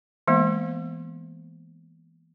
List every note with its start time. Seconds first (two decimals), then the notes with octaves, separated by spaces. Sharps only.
0.28 E3 G#3 A#3 B3